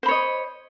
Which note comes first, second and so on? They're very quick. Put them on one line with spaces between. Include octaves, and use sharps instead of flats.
C5 B5 C#5 D#5